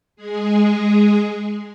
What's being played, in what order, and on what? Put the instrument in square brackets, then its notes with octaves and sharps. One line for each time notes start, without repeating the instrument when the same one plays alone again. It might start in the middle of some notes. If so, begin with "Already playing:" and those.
[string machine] G#3 G#4